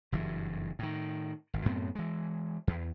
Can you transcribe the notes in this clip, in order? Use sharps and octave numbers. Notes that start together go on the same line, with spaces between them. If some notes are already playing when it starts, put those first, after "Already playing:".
F#1 G2 E3
A2 D#3
G#1
F#2 A2 B3 C4
E3 G#3
E2